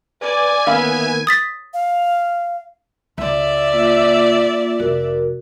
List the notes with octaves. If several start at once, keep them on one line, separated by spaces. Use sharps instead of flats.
B4 D5 G#5
D#3 A#3 B3 C#4 E5 F5 B5
D#6 A6 B6
F5
C#2 D5 E5
A#3 F4
F1 F#4 A#4